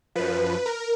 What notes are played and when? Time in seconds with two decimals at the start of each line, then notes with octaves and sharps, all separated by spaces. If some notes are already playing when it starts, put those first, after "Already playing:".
0.15 F#2 F3 B4
0.66 A#4